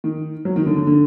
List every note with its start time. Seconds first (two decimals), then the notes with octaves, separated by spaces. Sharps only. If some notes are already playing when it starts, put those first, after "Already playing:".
0.04 D#3
0.45 F#3
0.56 D#3
0.66 D3
0.77 D3
0.87 D3